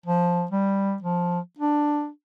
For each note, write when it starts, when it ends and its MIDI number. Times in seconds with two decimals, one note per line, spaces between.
0.06 0.45 53
0.51 0.96 55
1.02 1.39 53
1.59 2.08 62